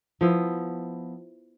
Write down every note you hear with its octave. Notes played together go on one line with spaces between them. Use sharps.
F3 B3 E4